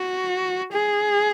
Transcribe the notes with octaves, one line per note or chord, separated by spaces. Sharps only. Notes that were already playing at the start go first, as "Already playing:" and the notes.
Already playing: F#4
G#4